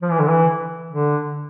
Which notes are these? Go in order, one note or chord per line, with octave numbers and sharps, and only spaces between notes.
F3
E3
D3
E3
D3